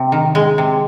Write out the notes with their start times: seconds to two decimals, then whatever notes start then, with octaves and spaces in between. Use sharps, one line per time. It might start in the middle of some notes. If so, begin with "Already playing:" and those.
Already playing: C3
0.12 D#3
0.35 G#3
0.58 C3